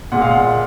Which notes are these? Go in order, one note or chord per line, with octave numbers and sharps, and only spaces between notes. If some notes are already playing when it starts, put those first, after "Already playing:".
A#2 G#3 F#5
F5
F#5